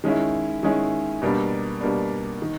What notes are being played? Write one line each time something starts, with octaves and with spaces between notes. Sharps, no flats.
D#3 G#3 C#4 E4
D#3 G#3 C#4 E4
B2 G3 A#3 D4
B2 G3 A#3 D4
D#3